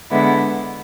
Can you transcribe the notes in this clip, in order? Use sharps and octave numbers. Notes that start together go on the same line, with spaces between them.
D3 G#3 B3 E4